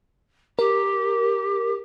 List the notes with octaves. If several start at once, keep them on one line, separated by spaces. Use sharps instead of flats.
G4 A#4